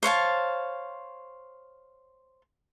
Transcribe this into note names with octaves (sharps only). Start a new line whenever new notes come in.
C5 C#5 F5 A5